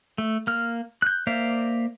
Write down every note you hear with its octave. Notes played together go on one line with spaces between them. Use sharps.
A3
A#3 F6
F#6 G6
A#3 C5 D5 E5 F5